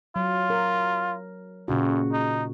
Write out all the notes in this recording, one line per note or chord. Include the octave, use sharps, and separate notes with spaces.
F#3 F4
A#4
F2 A#2 C#3 F#4
D#4